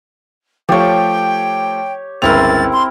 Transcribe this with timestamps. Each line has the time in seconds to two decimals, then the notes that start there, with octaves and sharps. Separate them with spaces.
0.69 F3 A3 F4 G4 C#5 G5
2.22 G1 C#2 C4 E4 A#4 A6 F7
2.72 C6